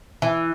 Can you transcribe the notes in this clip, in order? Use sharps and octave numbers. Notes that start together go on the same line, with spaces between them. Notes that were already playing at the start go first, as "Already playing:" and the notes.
E3